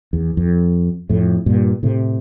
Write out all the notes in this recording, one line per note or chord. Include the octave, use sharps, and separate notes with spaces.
E2
F2
F2 A2
G2 A#2
A2 C3